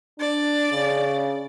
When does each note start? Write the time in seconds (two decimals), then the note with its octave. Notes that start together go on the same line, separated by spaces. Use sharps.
0.19 D4 D5
0.72 C#3